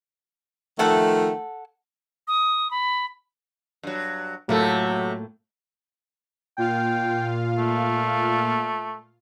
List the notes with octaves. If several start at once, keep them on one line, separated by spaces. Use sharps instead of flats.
D#3 F3 A3 A4 F#5
D#6
B5
G2 F#3
A2 C3 F#3 A3 A#3 F4 A4
A#2 F4 F5 G5
A3